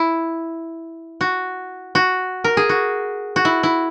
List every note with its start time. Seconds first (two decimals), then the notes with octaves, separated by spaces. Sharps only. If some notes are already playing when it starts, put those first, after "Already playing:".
Already playing: E4
1.21 F#4
1.95 F#4
2.44 A#4
2.57 G#4
2.69 F#4
3.36 F#4
3.45 E4
3.63 E4